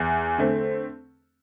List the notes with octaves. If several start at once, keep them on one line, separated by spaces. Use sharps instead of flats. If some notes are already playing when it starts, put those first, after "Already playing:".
Already playing: E2
D3 A3 C4